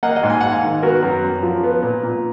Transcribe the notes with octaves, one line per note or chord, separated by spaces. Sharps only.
A#3 D#5 F#5
D#5 F#5
G#2
G#5
G#2 F#5
F5 G#5
D#3
B3 F#4 A#4
F#2
F#2
F3
B3
A#2
A#2